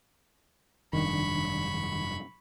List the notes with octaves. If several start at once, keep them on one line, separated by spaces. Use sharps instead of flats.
F1 G2 D#3 D4 B5 C#6